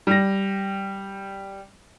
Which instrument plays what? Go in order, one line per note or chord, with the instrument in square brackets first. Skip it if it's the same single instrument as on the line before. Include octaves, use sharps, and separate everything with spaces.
[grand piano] G3 A#6